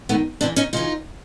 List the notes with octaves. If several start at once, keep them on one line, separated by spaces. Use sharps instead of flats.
G2 D#3 A3 B3
E2 C#3 E3 C4 D4
C#4 D#4
C#3 E3 D#4 F4